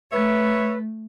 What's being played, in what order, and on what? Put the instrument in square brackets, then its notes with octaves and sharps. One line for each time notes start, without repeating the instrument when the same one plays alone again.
[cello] A3 [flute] B4 [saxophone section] C#5 E5